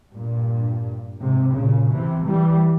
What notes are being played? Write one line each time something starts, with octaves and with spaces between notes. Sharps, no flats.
G2 A#2
G#2 C3
A#2 C#3
C3 E3
E3 G3